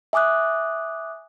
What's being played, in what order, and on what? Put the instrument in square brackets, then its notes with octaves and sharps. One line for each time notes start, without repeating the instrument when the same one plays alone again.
[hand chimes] E5 G#5 D6 D#6 F#6